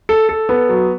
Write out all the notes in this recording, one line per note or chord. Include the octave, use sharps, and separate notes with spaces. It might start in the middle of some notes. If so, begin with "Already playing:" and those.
A4
A4
B3
F#3